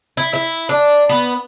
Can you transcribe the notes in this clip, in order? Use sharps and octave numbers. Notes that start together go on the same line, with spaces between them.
E4
E4
D4
B3